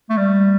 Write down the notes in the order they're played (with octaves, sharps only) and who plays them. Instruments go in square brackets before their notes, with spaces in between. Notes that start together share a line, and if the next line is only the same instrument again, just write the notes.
[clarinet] A3
G3